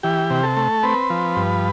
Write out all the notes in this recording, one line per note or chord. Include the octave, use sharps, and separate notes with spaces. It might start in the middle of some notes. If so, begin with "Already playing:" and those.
E3 G4
C3
A4
A3
C4 B4
F3
G2